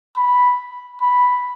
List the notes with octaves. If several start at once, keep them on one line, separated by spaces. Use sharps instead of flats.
B5
B5